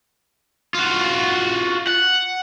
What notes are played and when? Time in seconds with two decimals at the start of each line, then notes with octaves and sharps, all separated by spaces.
0.74 F4 F#4
1.87 F#5